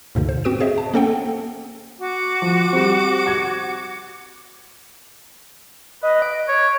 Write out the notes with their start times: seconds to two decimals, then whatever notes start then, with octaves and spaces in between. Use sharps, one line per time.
0.15 D2 G#2 B2 D3
0.29 C5
0.44 C4 F#4 B4 D#6 D7 E7
0.60 G#4 C5 D#5 E5
0.78 A5
0.94 A#3 C#4 A4 C5 F#5 G5
2.00 F#4 D6
2.42 F3
2.73 G3 C4
3.27 G#6
6.03 B4 D#5
6.22 D7
6.48 C#5